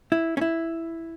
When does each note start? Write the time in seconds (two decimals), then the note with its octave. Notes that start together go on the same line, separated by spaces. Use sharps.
0.12 E4
0.37 C#4
0.41 E4